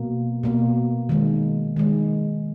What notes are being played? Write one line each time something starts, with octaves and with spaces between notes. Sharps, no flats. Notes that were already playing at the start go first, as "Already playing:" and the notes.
Already playing: B2 A#3
B2 A#3
D#3 G#3
D#3 G#3